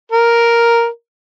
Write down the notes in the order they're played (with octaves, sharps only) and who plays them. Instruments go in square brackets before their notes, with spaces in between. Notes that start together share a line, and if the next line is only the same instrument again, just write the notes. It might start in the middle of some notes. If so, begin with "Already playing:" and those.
[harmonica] A#4